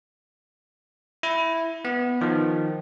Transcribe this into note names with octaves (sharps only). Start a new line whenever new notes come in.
E4
B3
D#3 F3